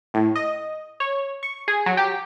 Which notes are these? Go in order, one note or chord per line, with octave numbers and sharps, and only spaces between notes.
A2
D#5
C#5
C#6
G#4
F#3
G4